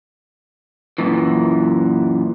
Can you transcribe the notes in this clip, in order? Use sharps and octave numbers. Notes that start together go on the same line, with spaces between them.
F#2 A#2 E3